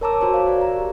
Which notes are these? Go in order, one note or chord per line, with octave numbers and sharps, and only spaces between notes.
A#4 C#5 A5 A#5 D6 E6
F#4 A#4 C5 C#5
F5
A#4 D5
A#5
G4